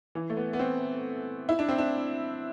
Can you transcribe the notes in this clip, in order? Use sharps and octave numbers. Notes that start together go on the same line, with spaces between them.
E3
A3
B3
B3
C4
E4
D4
C4
D4